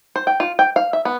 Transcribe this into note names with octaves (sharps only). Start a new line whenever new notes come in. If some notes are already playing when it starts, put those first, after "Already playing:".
C5
G5
F4
G5
F5
E5
B3